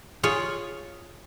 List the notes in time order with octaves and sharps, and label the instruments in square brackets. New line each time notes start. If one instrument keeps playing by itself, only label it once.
[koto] F4 G#4 C#5